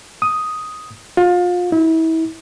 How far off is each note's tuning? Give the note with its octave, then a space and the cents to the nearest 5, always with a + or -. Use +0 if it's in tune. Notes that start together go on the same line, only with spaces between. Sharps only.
D#6 +5
F4 +30
E4 -35